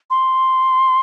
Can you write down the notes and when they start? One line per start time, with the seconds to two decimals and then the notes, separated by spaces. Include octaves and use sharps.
0.10 C6